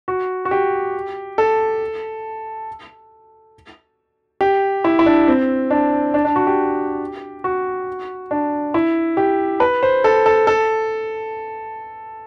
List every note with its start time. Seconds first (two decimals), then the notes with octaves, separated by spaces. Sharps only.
0.08 F#4
0.45 F#4
0.51 G4
1.38 A4
4.41 G4
4.84 E4
4.99 E4
5.06 D4
5.28 C4
5.71 D4
6.14 D4
6.25 D4
6.36 F#4
6.47 G4
7.44 F#4
8.31 D4
8.74 E4
9.17 G4
9.60 B4
9.83 C5
10.04 A4
10.26 A4
10.47 A4